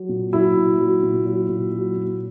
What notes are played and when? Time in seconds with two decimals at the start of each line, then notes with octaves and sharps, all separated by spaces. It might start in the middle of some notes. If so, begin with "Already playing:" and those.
Already playing: F#3
0.09 A#2
0.32 F#3 E4
0.57 A#2
0.79 F#3
1.03 A#2
1.26 F#3
1.49 A#2
1.72 F#3
1.96 A#2